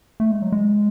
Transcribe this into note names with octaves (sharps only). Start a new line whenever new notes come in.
A3
G#3
F#3
G#3